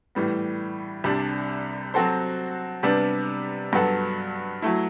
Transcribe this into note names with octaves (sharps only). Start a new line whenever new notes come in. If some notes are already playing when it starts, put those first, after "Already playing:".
A2 E3 G3 B3
C2 C3 G3 D4
F#3 C4 F#4 A4 C5
C3 G3 B3 D4
G2 F#3 B3 F#4 A4
F#3 A3 E4